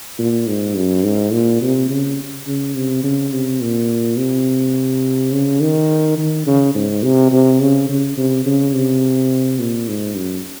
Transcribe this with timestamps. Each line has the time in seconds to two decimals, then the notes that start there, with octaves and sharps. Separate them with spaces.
0.19 A#2
0.47 G#2
0.77 F#2
1.04 G#2
1.33 A#2
1.62 C3
1.90 C#3
2.47 C#3
2.75 C3
3.04 C#3
3.33 C3
3.61 A#2
4.18 C3
5.32 C#3
5.61 D#3
6.18 D#3
6.46 C#3
6.75 G#2
7.03 C3
7.32 C3
7.61 C#3
7.89 C#3
8.17 C3
8.46 C#3
8.75 C3
9.59 A#2
9.88 G#2
10.17 F#2